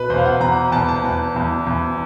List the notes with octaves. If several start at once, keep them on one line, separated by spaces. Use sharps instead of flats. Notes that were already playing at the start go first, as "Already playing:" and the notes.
Already playing: B2 B4
E2 C5
F5
F#5
E2 A#5
E2 A5
A5
E2
E2
E2